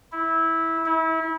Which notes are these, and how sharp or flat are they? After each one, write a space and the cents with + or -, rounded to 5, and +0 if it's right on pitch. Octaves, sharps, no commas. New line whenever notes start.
E4 -15
E4 -30